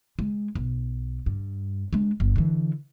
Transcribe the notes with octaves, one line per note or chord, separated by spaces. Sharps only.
G#3
B1
G2
G#3 D4
G1
D3 E3